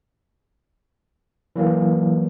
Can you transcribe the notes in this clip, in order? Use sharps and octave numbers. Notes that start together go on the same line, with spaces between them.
E3 F#3 A#3